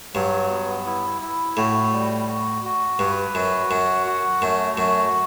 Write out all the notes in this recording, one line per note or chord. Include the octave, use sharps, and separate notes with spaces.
G2 F#3
B3
E4
E4
A2 F#4
G3
F#4
F#4
G2 B4
F#2 F#4
F#2 F#5
F#4
F#2 A3
F#2 F#4